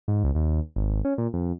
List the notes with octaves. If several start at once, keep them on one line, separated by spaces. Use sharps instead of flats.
G#2
C#2
D#2
G#1
C#4
A#2
F2